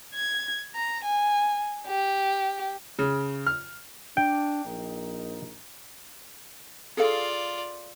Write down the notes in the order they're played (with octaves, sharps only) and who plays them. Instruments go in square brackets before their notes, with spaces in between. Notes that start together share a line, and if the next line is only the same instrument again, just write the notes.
[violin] G#6
A#5
G#5
G4
[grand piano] C#3
F6
[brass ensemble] D4 [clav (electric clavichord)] G5
[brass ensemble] A#1 D#4
[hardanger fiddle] F4 D5 [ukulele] G#4 A4 F5